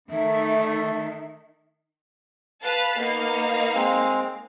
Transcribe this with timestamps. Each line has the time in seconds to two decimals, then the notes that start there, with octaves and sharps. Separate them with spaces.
0.10 D#3 A3 E5
2.63 B4 F5 A5
3.00 A#3 B3 D#4 F5
3.75 G#3 C4